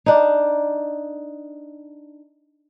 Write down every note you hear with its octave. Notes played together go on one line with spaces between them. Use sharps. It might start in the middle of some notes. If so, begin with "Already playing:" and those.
D4 D#4